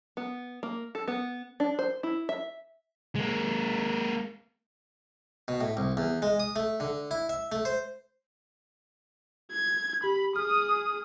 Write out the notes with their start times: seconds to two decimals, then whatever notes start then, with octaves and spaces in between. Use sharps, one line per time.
0.17 B3
0.63 A#3
0.95 A4
1.08 B3
1.60 D4
1.79 C5
2.03 E4
2.29 E5
3.15 G#3 A#3
5.48 B2
5.61 A2
5.77 C2
5.97 E2
6.22 G#3
6.40 D#6
6.56 A3
6.80 D3
7.11 E4
7.29 E5
7.52 A3
7.65 C5
9.52 G#6
10.04 G4 B5
10.36 G#4 D#6 F6